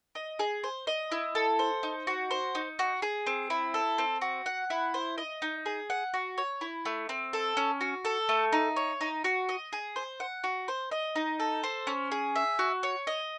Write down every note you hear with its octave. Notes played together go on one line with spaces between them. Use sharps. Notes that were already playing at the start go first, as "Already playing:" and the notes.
D#5
G#4
C5
D#5
E4
A4
C5
D#4
F#4
C5
D#4
F#4
G#4
C4
E4
A4
C4
F#4
F#5
E4
C5
D#5
D#4
G#4
F#5
F#4
C#5
E4
A3
C4
A4
C#4
F#4
A4
A3
D#4
C#5
D#4
F#4
D#5
G#4
C5
F#5
F#4
C5
D#5
D#4
A4
C5
C#4
G#4
E5
F#4
C#5
D#5